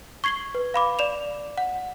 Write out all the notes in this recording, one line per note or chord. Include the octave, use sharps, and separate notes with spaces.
C#6 G#6 C7 F#7 G7
B4
F5 B5 D6
D5 E7 F7
F#5